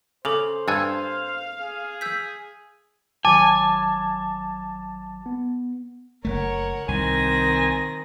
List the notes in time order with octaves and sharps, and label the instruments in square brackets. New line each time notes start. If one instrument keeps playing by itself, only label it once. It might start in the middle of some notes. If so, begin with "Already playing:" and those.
[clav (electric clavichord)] C#3 [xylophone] A4 D6 F7 [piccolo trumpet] C5
[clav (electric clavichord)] G2 A4 G#5 [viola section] F5 [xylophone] E6 F#6 G#6
[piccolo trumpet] G#4
[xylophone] E6 G6 B6
[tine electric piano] G#1 F#3 [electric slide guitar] G#5 [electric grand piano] A5 [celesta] D6
[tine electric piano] B3
[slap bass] F#1 A3 [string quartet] A#4 C#5 F#5
[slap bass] C2 [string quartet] D#3 C4 A#6 [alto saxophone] G#5